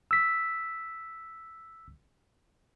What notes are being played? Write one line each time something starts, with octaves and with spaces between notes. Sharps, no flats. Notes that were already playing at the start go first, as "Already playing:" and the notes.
E6 B6